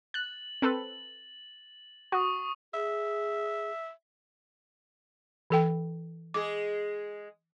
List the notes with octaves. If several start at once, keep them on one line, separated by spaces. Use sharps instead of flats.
F#6 A6 F#7
C4 A4 B4
F#4 C#6 D#6
G#4 E5
E3 A4 G5
G#3 G#4 D6